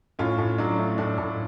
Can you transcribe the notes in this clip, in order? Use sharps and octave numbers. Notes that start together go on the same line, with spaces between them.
A2 C#4 F4
A2
F#3 D4
A3
A2 D4
A2 D4